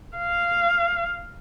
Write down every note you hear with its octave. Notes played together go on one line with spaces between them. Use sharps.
F5